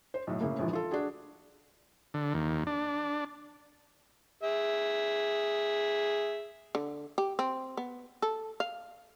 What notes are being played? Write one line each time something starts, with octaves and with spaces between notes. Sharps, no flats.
C5
B1 A2
A2 C#3 A#3
A#1 D#2 G#2 E3 F3
F4 A4
D4 F#4 G#4
D3
D#2
D4
G#4 E5
D3
G4
C4
B3
A4
F5